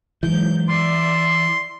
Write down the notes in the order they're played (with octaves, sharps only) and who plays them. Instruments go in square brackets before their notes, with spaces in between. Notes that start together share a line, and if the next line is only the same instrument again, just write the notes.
[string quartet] G#2 F#3 [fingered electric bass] E3 [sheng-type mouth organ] G6
[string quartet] D5 E5 [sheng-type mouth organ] C6